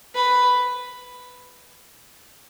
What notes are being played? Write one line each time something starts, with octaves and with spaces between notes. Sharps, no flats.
B4